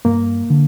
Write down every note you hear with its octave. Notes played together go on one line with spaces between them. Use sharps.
G2 A#3
D3